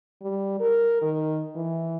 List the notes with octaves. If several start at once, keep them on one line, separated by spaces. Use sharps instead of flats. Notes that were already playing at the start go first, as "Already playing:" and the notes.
G3
A#4
D#3
E3